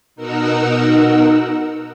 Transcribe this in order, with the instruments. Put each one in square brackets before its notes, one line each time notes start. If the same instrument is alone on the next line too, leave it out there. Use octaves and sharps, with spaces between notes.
[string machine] B2 D#4 A#4 F#5 E6